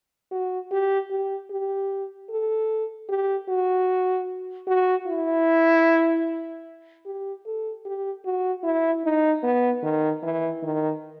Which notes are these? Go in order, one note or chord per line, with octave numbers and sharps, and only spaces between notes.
F#4
G4
G4
G4
A4
G4
F#4
F#4
E4
G4
A4
G4
F#4
E4
D#4
B3
D#3
E3
D#3